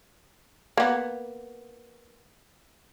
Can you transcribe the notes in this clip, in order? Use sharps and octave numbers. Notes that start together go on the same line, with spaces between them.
A#3 B3